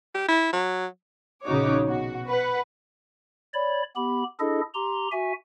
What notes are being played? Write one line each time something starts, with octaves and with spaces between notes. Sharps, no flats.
G4
E4
F#3
A#1 C#3 D#4 F#4 C#5 D6
B2 F#4
B4 F#5
C#5 D5 B5
B3 G4 B5
D4 E4 G#4 A4 D#5
G4 A#5 C6
F#4 E5 G#5